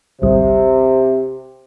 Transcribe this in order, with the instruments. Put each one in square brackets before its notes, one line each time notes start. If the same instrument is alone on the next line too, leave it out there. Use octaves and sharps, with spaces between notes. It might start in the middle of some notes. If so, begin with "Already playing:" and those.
[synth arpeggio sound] A1 D2 G3 [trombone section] C3